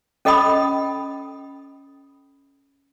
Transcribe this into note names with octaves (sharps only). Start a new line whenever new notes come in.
C#4 A4 D#5 G5 B5 D#6